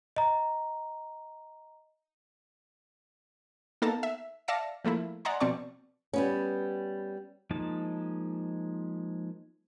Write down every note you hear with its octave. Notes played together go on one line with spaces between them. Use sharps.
D#5 A#5
A#3 B3 D#4 A4 A5 A#5
E5
D5 E5 F5 A5 A#6 C#7
F3 A3 A#3 E4
D5 D#5 F#5 G#5 A#5 C6
B2 F3 C4 D5 A5 C#6
G3 B3 C#4
F3 G#3 A#3 D#4 A5